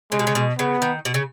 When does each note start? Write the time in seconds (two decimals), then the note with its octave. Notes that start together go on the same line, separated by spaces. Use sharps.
0.12 C#3 G#3
0.19 B2
0.27 C#3
0.35 B2
0.59 C#3 B3
0.82 D#3
1.05 B2
1.14 C#3